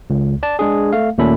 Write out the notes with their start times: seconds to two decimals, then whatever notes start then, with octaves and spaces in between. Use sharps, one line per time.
0.10 C#2
0.43 D5 A5
0.59 G#3 D4 G#4
0.93 A3 F5
1.18 D#2 A#2 A3 C#4 A4 B5